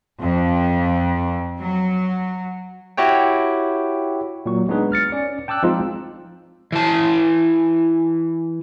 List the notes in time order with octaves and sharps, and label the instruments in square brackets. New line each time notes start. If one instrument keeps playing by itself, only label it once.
[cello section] F2
F#3
[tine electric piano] E4 F#4 G4 C#5 G5
A#2 F#3 C#6
G#3 B3 D4 D#4 G#4 B4
F6 A6 C#7
C#4 D5
G5 A5 D6 E6 F#6
F3 G#3 C4 D#4 F4
[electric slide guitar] E3 A5